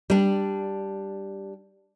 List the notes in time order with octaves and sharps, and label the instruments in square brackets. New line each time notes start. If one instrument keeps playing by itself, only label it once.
[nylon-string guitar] G3 D4